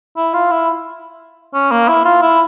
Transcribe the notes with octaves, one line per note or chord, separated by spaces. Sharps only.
E4
F4
E4
C#4
A#3
E4
F4
E4